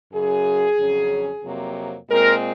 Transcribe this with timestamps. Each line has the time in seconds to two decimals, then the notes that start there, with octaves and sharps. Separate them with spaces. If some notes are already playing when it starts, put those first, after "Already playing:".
0.13 F#2 C#3 F#3 G#4
0.79 F2 C#3 F#3 C#4
1.44 F2 C3 F#3 A#3
2.09 A#2 G#3 C4 A#4